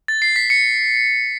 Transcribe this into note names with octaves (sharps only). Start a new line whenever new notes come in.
A6
C7
B6
C#7